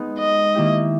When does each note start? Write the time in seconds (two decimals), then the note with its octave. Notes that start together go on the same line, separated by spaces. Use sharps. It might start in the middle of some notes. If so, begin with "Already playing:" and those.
Already playing: G#3 B3 D#4
0.19 D#5
0.55 D#3 A#3 E4 G4